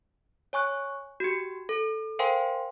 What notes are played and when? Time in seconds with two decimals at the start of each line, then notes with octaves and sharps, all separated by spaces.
0.53 C#5 G#5 C#6 F#6
1.20 F#4 G4
1.69 A4
2.19 A#4 C5 F5 G5 G#5 C6